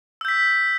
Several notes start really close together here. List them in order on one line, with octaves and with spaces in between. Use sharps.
E6 G6 B6